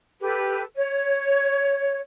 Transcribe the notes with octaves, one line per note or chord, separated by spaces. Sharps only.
G4 A4 B4
C#5